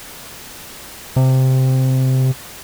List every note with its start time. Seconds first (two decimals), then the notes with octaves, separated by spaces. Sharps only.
1.16 C3